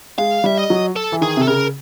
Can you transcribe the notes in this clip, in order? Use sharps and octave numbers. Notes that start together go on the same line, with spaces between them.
G#3 F5
G3 E5
D#5
F#3
A4
E3
D#3 G#4
C3
A4
C#3 A#4